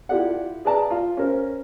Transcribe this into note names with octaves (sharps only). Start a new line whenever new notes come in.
E4 F4 G4 A4 D5 F#5
G#4 B4 D5 A5 A#5
F4
C#4 A#4 C5